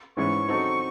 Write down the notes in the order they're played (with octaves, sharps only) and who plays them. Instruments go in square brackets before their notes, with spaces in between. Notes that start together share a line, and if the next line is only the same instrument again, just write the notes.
[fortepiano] G#2 E3 G#3 C#4 E4 [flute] C#6
[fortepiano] F#3 C4 D#4 F#4 A4